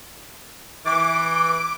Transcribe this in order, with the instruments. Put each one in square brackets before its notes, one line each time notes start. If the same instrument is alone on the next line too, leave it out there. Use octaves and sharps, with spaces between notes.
[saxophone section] E3 [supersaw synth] D6